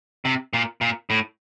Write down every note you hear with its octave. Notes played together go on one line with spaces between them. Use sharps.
C3
A#2
A#2
A2